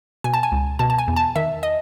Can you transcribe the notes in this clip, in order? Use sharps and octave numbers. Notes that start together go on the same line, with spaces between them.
B2 G#5
A5
G#5
C#2
B2 A5
A5
G#5
E2
A5
D#3 E5
D#5